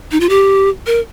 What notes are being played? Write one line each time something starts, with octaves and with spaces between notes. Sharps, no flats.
D#4
F4
G4
A#4